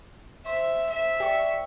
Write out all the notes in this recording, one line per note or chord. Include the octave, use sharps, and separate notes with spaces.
C5 E5
E5
G4 D5 C#6